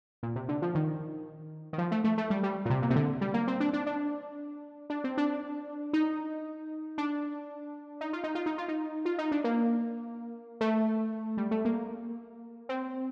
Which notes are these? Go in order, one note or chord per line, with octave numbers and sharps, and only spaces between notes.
A#2
C3
D3
F3
D#3
D#3
F3
A3
A3
A3
G3
G3
A#2
C3
A#2
C3
D3
G3
A#3
C4
D4
D4
D4
D4
C4
D4
D#4
D4
D#4
F4
D#4
F4
D#4
F4
D#4
F4
D#4
D4
A#3
A3
G3
A3
A#3
C4